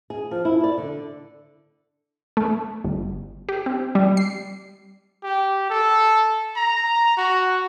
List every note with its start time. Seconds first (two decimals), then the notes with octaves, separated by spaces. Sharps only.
0.10 G#4
0.31 F3
0.45 E4
0.64 D5
0.78 D3
2.37 A3
2.84 G1
3.49 G4
3.66 C4
3.95 G3
4.17 C7
5.23 G4
5.70 A4
6.56 A#5
7.17 F#4